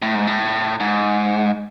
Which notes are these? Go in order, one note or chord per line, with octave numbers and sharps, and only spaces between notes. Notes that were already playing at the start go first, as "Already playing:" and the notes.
A2
G#2
A2
G#2